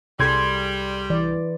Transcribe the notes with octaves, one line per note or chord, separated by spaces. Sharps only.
C2 G3 G#4 A4 C6 G#6
E3 D5